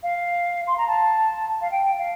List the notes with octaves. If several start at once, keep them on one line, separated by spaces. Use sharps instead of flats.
F5
C6
A#5
A5
F5
G5
F5